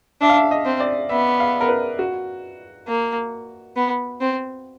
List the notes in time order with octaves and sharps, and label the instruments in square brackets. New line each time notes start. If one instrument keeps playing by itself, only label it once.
[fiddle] D4 [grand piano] E5
[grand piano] F5
E5
D#5
[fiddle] C4
[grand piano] D5
[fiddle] B3 [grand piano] E5
[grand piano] F5
A#4
B4
F#4
[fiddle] A#3
B3
C4